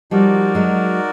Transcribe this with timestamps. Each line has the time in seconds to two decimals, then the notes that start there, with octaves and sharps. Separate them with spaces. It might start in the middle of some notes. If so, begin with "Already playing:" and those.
0.11 F3 G3 D#4 F#4 A#4 D5
0.55 F#3 G#3